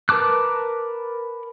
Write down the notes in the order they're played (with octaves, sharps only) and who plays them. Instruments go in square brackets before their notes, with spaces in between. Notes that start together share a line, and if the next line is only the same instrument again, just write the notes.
[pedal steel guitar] A#4 B4 A5 D6 F#6